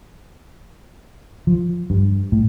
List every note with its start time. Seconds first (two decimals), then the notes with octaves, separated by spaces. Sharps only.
1.47 F3
1.90 G2
2.32 A2